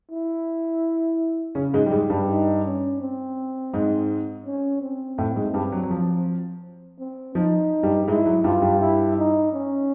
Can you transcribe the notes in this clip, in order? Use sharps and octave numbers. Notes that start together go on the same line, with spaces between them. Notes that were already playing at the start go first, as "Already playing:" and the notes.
E4
C#3 C#4
G#2 G#3
G3
G#2 G#3
G2 G3
D#4
C#4
C4
G#2 G#3
C#4
C4
A2 A3
G#2 G#3
G2 G3
F#3
F#3
F3
C4
F3 D#4
G2 G3
G#2 G#3 E4
F#3
G2 G3 F4
G2 G3
E4
D#4
C#4